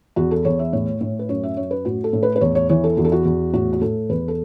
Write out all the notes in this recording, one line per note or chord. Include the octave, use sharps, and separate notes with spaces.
E2 F#4
A4
E2 C#5
E5
A2 C#5
A2
B4
F#2 C#5
E5
F#2 C#5
B4
A2 F#4
A4
A2
B4
B4
E2 C#5
C#5
E3 C#5
A4
E2 F#4
A4
F#4
E2
A2 F#4
F#4
A2 A4
E2 B4
A4